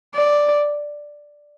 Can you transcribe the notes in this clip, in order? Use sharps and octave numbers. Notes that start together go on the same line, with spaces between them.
D5